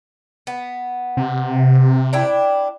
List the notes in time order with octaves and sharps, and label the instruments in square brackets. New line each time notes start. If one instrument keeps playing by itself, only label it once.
[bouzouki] B3
[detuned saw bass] C3
[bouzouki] D4 E4 G5